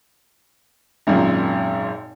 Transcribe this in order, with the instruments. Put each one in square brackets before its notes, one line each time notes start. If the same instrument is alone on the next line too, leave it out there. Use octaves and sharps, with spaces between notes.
[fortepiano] G#1 F#2 A#2